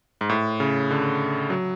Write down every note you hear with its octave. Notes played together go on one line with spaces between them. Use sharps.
G#2
A2
C#3
D3
F#3